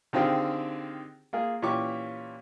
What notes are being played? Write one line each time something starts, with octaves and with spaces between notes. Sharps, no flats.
D3 D#3 C4 F4 G4 G#4
A#3 F4 G#4
A#2 E3 C#4 G4 C#6 D6